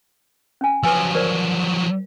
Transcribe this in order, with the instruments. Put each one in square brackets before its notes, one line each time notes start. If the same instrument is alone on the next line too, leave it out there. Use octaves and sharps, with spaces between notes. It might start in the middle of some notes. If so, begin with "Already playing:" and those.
[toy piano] C#4 G#5
[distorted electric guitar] F3 F#3 [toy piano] B4 G#5 E6
[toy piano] A#4 C5 D5